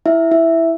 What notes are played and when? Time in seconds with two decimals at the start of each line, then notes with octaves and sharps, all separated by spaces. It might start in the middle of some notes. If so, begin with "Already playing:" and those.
0.06 E4 E5
0.31 E4 E5